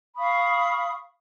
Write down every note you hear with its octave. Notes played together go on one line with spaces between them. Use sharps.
F5 B5 C#6 D#6